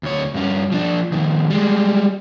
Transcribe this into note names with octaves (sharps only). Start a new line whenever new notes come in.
D2 C#5
G2 C#4
F3 D4
F2 D#3
G3 G#3